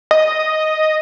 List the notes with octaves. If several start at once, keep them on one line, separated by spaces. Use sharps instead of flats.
D#5